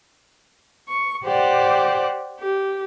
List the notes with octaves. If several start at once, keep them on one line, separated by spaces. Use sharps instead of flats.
C#6
G4 C5 D5 F#5
G4